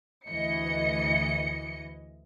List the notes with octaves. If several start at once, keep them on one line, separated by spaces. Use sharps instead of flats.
D2 E3 D#5 C#7